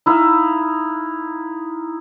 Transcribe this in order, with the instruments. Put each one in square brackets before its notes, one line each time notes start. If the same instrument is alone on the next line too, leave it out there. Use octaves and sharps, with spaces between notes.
[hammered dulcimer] D#4 E4 F5